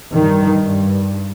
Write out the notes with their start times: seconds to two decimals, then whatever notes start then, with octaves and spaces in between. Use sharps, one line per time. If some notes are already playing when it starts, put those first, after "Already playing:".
0.13 G2 D#3
0.66 G2